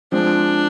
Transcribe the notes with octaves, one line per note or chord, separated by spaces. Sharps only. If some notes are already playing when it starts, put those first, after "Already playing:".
F3 G#3 C4 D4